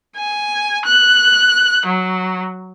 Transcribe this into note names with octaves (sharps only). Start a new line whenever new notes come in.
G#5
F#6
F#3